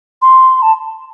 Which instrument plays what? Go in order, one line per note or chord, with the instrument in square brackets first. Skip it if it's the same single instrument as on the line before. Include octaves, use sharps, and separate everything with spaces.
[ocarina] C6
A5